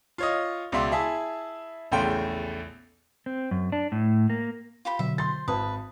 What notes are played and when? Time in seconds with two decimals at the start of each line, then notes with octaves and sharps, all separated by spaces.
0.18 F4 C#5 D#5
0.72 C#2 B2 D5 E5 C6
0.92 E4 G#4 E5 A5
1.92 A#1 E2 C#3 A3 G5 C6
3.26 C4
3.51 F#2
3.72 D4
3.92 A2
4.30 A#3
4.85 F4 G4 B5
4.99 B2 D3 F#3 E5
5.18 C5 C6 A6
5.48 G#1 B4 A5 D#6